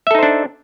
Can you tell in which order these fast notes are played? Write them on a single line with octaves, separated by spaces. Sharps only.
E5 A4 D#4 C5 D4